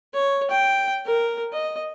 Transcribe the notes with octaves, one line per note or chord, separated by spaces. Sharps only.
C#5
G5
A#4
D#5